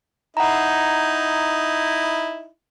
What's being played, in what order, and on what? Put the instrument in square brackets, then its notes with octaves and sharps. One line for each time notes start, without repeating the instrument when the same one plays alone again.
[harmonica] D#4 E4 [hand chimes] F#5 A#5